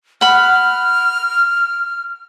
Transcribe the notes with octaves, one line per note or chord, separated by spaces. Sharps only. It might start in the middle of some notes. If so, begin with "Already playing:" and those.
F#5 B5 F6